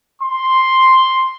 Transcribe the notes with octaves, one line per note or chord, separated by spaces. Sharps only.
C6